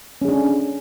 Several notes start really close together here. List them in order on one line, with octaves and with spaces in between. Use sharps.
C#4 G#4 D4